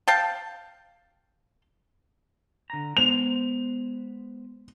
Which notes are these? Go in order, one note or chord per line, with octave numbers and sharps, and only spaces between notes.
F5 G5 A5
D3 A#5
G#3 B3 C5 F7